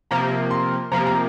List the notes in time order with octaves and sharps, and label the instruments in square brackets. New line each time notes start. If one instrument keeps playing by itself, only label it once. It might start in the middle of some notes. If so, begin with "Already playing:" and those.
[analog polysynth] C3 F3 A#3 [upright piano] A#5
[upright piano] C6
[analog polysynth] C3 F3 A#3 [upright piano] A#5
[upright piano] A#5